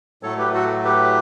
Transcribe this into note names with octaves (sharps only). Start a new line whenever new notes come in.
A2 F#3 A3 A4 C#5
G4 B4
F#4 A4
G4 B4